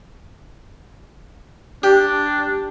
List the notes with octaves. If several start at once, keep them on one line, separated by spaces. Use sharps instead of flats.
D4 G4